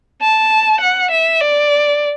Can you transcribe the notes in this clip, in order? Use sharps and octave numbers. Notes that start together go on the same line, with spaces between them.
A5
F#5
E5
D5